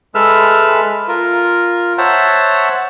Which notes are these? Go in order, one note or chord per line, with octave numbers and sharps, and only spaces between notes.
G#3 A4 B4 E5 E6 F6
F4 A#4
C5 C#5 E5 F#5 A5